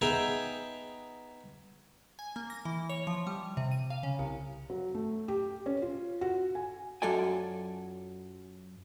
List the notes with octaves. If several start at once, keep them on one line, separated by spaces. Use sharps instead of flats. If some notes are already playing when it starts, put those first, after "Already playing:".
B3 D#4 G#4 E5 G5 A#5
G#5
A#3
A#6
E3
C#5
F3
G3
C3
D#7
F5
C#3
C2
F#3
A3
G4
C#4
F4
F#4
G#5
F#2 F#3 F4 A4 D5 G#5